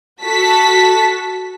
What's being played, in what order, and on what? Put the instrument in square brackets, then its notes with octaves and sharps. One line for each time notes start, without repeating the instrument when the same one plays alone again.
[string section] F#4 A4 A5 B6